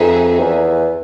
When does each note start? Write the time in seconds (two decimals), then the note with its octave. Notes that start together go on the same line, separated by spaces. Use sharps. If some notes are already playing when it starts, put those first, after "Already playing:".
Already playing: F2 D#4 G#4 B4 E5 G#5
0.40 E2